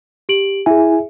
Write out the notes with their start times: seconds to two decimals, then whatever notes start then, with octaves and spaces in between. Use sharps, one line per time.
0.29 G4 D7 F#7
0.66 E4 G#4 E5 G#5